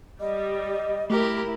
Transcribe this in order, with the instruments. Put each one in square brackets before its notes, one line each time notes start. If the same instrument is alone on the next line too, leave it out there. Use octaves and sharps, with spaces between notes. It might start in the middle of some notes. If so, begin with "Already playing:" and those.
[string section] G3 [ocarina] D#5
[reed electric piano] A3 [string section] E4 [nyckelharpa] G4 A#4